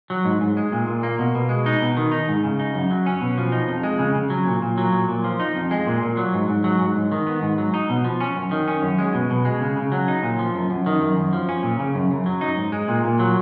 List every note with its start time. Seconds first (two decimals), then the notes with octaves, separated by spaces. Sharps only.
0.10 F#3
0.25 G#2
0.41 G#2
0.57 G#3
0.72 A#2
0.87 A#2
1.03 A#3
1.19 B2
1.35 B2
1.49 G#3
1.66 D#4
1.82 B2
1.97 D#3
2.12 D#4
2.28 G#2
2.44 C#3
2.59 D#4
2.74 F#2
2.91 F#3
3.06 C#4
3.21 B2
3.38 F3
3.52 D#4
3.68 F2
3.83 G#3
3.99 C#3
4.15 C#3
4.30 F#3
4.47 A#2
4.62 A#2
4.78 F#3
4.93 A#2
5.08 A#2
5.24 F3
5.40 D#4
5.56 F2
5.71 G#3
5.87 A#2
6.03 A#2
6.17 F#3
6.34 G#2
6.49 G#2
6.64 F#3
6.80 G#2
6.96 G#2
7.12 D#3
7.27 B3
7.42 G#2
7.58 F#3
7.74 D#4
7.89 B2
8.04 F3
8.20 C#4
8.36 F#2
8.51 D#3
8.68 C#4
8.83 F#2
8.98 G#3
9.14 B2
9.30 B2
9.45 G#3
9.61 C#3
9.77 C#3
9.92 F#3
10.08 D#4
10.23 A#2
10.39 F3
10.55 F#2
10.70 F#2
10.86 D#3
11.01 F#2
11.17 F#2
11.33 F3
11.49 C#4
11.63 A#2
11.79 C#3
11.95 F#2
12.11 F#2
12.26 F#3
12.41 D#4
12.58 G#2
12.72 G#3
12.88 A#2
13.05 A#2
13.20 F#3